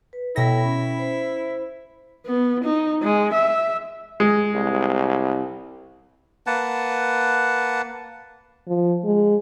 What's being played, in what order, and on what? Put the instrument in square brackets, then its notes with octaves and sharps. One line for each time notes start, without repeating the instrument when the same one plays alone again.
[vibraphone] B4
[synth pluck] B2 A#6 [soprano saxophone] E4 [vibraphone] A4 C#5 G5
[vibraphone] C#4 B5
C5
[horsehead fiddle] B3
D#4
G#3
E5
[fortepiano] G#3
[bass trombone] C2
[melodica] A#3 B4 F#5 A5
[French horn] F3
G#3